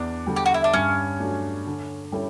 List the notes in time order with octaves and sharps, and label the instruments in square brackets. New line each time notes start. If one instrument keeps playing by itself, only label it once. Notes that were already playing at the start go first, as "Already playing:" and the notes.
Already playing: [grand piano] E2 [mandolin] D4
[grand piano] D3 G3
[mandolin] G4
F#4
E4
D4
[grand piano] G2 [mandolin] C#4
[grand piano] F#3 A3 D4
D3
G3 C#4 E4 A4